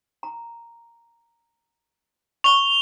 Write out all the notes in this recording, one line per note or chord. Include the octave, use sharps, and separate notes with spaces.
A#5
C#6 F7 G7